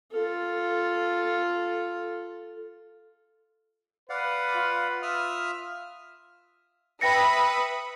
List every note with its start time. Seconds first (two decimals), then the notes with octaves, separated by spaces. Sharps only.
0.11 F4 A4
4.09 B4 D5 F5 F#5
4.56 F4
5.02 E5 D#6 F6
7.01 B4 E5 G5 B5 D#6 A#6 C#7